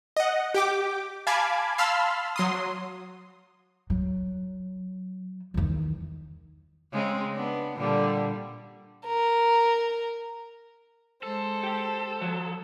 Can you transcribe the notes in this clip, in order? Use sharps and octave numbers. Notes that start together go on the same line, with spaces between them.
D#5 F#5
G4 G5 D6
F5 G#5 A5 B5 D6 G#6
F5 A5 B5 C6 E6 F6
F#3 C6 D#6
F#3
E2 D#3
C#3 G#3 C4
B3 D4
A#2 D3 G3
A#4
G#3 A4 C5
G4 G5
F3 F#4